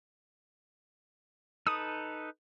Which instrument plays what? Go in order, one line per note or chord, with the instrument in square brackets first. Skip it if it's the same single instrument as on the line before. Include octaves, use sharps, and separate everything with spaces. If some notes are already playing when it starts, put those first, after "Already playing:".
[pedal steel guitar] D#4 A4 B4 [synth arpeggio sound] D#6